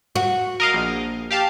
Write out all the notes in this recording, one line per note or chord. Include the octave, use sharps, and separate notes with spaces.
F#4
A#4 D#5 F5
A#1
G4 F5 A5